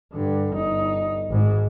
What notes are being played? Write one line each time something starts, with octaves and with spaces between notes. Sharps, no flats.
G2 D3
G1 D#4
G#1 G#2